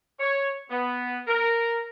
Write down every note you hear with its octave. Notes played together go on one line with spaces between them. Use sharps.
C#5
B3
A#4